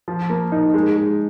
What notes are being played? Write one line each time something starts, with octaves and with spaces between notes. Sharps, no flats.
F3
A#3
D#4
G#3
G#3